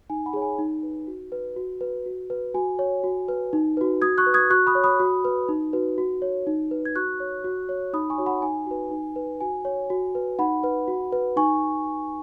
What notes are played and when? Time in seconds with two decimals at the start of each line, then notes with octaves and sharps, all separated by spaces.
0.10 D#4 G#5
0.26 F#5 B5
0.33 G#4 C#5
0.42 G#5
0.59 D#4
0.83 B4
1.07 F#4
1.32 B4
1.56 F#4
1.81 B4
2.06 F#4
2.30 B4
2.54 F#4 G#5
2.79 C#5
3.04 F#4
3.28 B4
3.53 D#4
3.77 F#4 B4
4.02 F#4 D#6 G#6
4.18 C#6 F#6
4.27 B4
4.34 D#6 G#6
4.50 F#4 C#6 F#6
4.67 B5 D#6
4.75 C#5
4.84 B5 D#6
5.00 F#4
5.25 B4
5.48 D#4
5.73 F#4 B4
5.98 F#4
6.22 C#5
6.47 D#4
6.71 B4
6.85 G#6
6.96 F#4 C#6 F#6
7.20 C#5
7.44 F#4
7.69 C#5
7.94 D#4 B5 D#6
8.10 G#5 C#6
8.18 F#4 C#5
8.26 F#5 B5
8.42 D#4 G#5
8.67 F#4 B4
8.91 D#4
9.16 B4
9.41 F#4 G#5
9.65 C#5
9.90 F#4
10.15 B4
10.39 D#4 F#5 B5
10.64 B4
10.88 F#4
11.12 B4
11.37 D#4 G#5 C#6